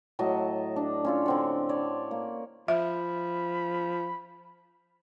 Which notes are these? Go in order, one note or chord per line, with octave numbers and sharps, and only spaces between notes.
A2 F#3 D#5 A5
D4
C#4 F4 A4
D3 C4 F#5
C#5 D5 A5
A#3
F3 E5 B5